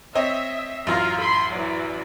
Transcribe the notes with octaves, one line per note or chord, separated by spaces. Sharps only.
C4 C#5 D#5 E5
A1 F#2 F4 A#5
B5 C6
E3 F#3 D5